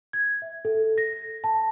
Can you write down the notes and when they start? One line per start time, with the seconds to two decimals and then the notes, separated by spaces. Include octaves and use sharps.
0.13 G#6
0.42 E5
0.65 A4
0.98 A#6
1.44 A5